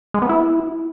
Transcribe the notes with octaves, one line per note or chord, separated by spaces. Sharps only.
G#3
B3
E4